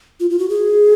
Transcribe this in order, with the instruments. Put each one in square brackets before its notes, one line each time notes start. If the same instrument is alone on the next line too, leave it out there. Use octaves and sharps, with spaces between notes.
[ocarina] F4
F4
F#4
G#4